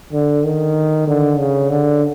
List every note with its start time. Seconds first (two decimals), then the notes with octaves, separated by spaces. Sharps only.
0.13 D3
0.44 D#3
1.07 D3
1.39 C#3
1.70 D3